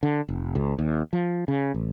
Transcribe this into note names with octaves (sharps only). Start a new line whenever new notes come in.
D3
F1
C#2
D#2
F3
C#3
A1